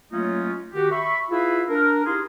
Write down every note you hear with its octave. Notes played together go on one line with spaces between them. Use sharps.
F#3 A3 A#3 C#4 D#4 F4
D#3 F#4 G4
E5 B5 C#6
E4 F4 G#4 B4 E5 F5
D4 A#4
D#4 E4 G4 G#4 F5 C6